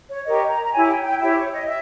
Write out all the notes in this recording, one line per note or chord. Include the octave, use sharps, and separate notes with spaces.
C#5
G4 A#4 C#5 D#5
A#5
A#5
E4 G4 C#5 G#5
G5
G5
E4 G4 C#5 E5
C#5
D#5
E5